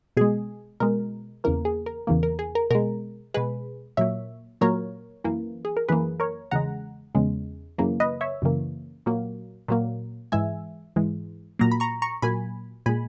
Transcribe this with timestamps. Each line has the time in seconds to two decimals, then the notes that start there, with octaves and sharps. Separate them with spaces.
0.17 B2 G#3 G#4
0.80 B2 G#3 A#4
1.44 E2 C#3 E3 A#3 A#4
1.65 G#4
1.86 A#4
2.07 E2 C#3 E3 A#3
2.23 A#4
2.39 G#4
2.55 A#4
2.71 B2 G#3 A#4
3.34 B2 G#3 G#4 B4
3.97 A#2 F#3 A#3 C#5 E5
4.61 A#2 F#3 A#3 A#4 C#5
5.24 F#2 E3 A#3
5.65 G#4
5.77 A#4
5.88 F#2 E3 A#3 G#4 B4
6.20 A#4 C#5
6.51 E2 C#3 G#3 F#5 A#5
7.15 E2 C#3 G#3
7.78 F#2 C#3 E3 A#3
8.00 B4 D#5
8.21 C#5 E5
8.42 F#2 C#3 E3 A#3
9.06 A#2 F#3 A#3
9.68 A#2 F#3 A#3
10.32 G#2 E3 G#3 E5 G#5
10.96 G#2 E3 G#3
11.59 A#2 F#3 A#3 A#5
11.71 B5
11.80 A#5 C#6
12.02 A#5 C#6
12.22 A#2 F#3 A#3 G#5 B5
12.86 A#2 G#3 G#5 B5